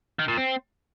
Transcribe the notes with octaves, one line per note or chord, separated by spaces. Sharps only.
D#3
A#2
C4